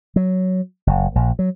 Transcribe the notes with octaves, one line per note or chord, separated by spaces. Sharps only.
F#3
F#1
A#1
F#3